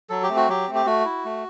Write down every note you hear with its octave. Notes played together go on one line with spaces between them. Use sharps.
F#3 A4
G4
A3 C4
F#4
F#3 G4
A3 C4
G4
A3 F#4
E4
A3